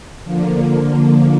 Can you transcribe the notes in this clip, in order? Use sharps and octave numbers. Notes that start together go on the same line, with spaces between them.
D3 F3 A#3
D3 F3 A#3